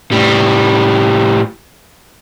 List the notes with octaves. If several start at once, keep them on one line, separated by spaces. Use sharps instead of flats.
A2 G3